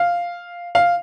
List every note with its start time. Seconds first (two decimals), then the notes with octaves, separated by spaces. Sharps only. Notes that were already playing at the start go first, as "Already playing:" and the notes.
Already playing: F5
0.75 F5